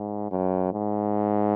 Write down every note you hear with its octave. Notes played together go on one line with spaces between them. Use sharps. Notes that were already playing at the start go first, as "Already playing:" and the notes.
Already playing: G#2
F#2
G#2